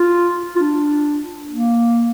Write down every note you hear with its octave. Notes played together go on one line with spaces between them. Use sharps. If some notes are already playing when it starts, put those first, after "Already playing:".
Already playing: F4
F4
D4
A#3